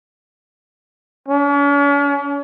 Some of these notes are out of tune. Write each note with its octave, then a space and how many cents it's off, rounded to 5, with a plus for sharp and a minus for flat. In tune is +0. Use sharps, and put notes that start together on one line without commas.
C#4 +45